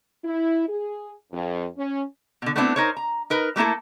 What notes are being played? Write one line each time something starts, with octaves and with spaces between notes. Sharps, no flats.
E4
G#4
F2
C#4
B2 D3
A3 B3 C4 D4 E4
D#4 A#4 C5 C#5
A#5
D#4 A#4 B4
G3 A3 A#3 E4 A4